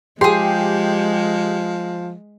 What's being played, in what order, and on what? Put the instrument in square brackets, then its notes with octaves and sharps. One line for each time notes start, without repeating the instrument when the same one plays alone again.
[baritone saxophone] F3 [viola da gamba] G#3 [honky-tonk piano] G4 [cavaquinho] G#4 C6